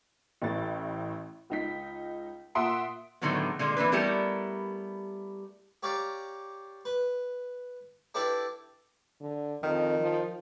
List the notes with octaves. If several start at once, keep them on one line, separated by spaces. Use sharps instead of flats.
A1 A2 A6
C#2 D#4 B6
A#2 E5 F#5 C6 D#6 D7
A2 D3 D#3 F#3 G#3 B3
A#2 D3 G#3 A#3
E3 A#3 D4 B4
G3 A3 B3 E4 G4 A#4
G4 C#5 D5 F5 A#5
B4
D4 E4 G4 A4 B4 D5
D3
F2 D#3
F3